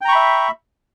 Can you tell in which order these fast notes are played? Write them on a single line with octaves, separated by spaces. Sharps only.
G5 A#5 C#6 B5 E5